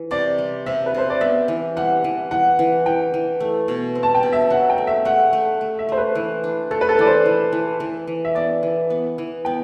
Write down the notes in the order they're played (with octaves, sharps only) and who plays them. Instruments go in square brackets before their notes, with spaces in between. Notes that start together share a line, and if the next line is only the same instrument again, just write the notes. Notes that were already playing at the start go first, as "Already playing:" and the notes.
Already playing: [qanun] E3
[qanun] C3 [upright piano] D5
[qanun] G3
[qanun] C3 [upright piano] E5
[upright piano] B4
[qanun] C3 [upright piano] C5
[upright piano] D5
[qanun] B3 [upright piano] E5
[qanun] E3
[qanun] G3 [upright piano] F#5
[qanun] E3
[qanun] E3 [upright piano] F#5
[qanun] E3
[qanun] E3 [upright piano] G5
[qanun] E3
A3
B2
C4
[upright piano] A5
G5
[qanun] B2
[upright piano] E5
[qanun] F#3 [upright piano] F#5
[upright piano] G5
[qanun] A3
[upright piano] E5
[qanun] A3 [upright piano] F#5
[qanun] A3
A3
[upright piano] E5
[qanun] A3 [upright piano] C5
[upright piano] B4
[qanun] E3
D4
[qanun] A3 [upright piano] A4
[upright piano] B4
A4
[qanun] E3 [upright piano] D5
[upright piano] C5
[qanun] E3
E3
E3
E3
[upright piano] E5
[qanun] B3 [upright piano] D5
[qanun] E3
B3
E3
[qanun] B3 [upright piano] G5